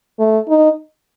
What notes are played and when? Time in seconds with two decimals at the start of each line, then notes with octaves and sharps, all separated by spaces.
0.19 A3
0.49 D#4